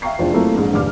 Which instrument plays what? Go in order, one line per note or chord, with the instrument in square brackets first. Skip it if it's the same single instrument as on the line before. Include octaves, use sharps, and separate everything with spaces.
[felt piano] E5 F5 G5 A#5 C#6 C7
F1 E2 D4 F4 C5
F#3 A3 A#3 C4 E4
A#1 G#2
F1 D#2 A#2 D6 F6